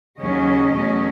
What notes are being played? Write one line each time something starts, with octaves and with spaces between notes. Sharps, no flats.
D#2 C#3 F#3 C#4 D#5
E2 B2 F#3 A3 C#4